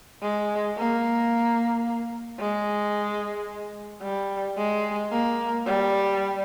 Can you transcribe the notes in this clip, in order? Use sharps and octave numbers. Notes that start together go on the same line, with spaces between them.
G#3
A#3
G#3
G3
G#3
A#3
G3